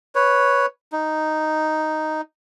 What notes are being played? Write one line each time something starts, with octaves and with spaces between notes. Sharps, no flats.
B4 C#5
D#4